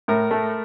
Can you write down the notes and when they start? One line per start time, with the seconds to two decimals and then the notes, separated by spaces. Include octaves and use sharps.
0.08 A2 A#4
0.31 A3